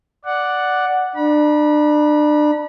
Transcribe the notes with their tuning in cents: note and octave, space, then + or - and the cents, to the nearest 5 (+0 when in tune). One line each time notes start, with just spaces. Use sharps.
D5 +0 F#5 +0
D4 +30 B5 -35